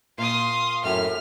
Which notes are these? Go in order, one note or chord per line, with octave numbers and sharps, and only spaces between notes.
A#2 F5 C6 D#6
F#2 A2 E5 F6